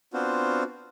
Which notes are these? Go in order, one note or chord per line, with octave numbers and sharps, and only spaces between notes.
B3 C4 D4 F4 F#4 C5